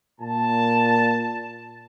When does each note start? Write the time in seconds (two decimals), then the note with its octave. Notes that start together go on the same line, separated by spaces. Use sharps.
0.21 A#2 A5